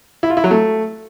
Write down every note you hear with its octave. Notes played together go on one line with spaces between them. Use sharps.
E4
F4
E4
F#3
A3